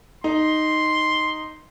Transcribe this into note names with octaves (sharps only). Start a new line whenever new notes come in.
D#4 C6